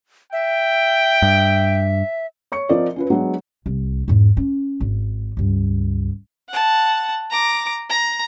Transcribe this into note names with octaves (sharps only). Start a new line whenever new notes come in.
E5 G5
G2
C#5 C#6 C#7
F3 C4 F4 A#4 D5 D#5
C#4 F4 B4
F#3 G#3 B3 D4 F#4
C2
E2 G#2
C#4
G#1
C#2 G2
F#5 A5
A#5 D6
A#5